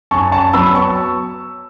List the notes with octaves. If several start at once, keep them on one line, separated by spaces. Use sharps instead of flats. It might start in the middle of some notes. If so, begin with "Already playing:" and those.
F#2 A5 C#6
A5 C#6
F#3 B3 B5 E6
A5 C#6